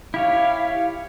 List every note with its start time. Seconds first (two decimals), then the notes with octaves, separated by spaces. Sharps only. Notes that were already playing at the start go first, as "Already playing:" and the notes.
0.14 E4 G4 C#5 F5